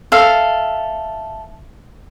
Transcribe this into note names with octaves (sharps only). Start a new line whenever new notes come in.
A4 E5 F5